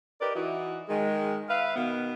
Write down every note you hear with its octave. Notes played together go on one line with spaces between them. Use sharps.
D#4 G4 A#4 B4 D5
E3 D#4 E4 F#4
D#3 G#3
B4 E5 F5
B2 D#3 B3